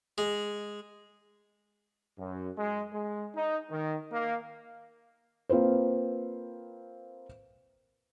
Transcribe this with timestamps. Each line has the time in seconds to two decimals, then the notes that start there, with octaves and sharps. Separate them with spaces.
0.18 G#3
2.18 F#2
2.57 G#3
2.92 G#3
3.34 D#4
3.69 D#3
4.11 A#3
5.49 A#3 C4 F4 B4 C5